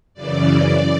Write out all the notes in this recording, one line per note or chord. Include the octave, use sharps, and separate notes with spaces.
F#2 C#3 E3 D5